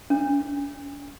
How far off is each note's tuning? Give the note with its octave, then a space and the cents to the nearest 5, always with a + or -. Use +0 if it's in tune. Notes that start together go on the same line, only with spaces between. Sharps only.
C#4 +45